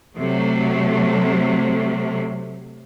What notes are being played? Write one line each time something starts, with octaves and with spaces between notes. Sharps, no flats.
C3 F#3 A3